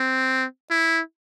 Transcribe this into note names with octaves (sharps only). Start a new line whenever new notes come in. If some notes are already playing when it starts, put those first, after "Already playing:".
Already playing: C4
E4